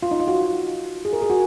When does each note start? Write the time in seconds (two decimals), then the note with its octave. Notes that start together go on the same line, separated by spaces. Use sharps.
0.03 F4
0.11 D#4
0.20 F4
0.28 F#4
1.05 G#4
1.13 A#4
1.22 G#4
1.30 F#4